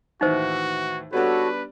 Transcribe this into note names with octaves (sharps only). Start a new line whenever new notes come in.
D#2 A2 E3 D#4 F#4 C5
G3 B3 D4 F#4 A4 B4 C#5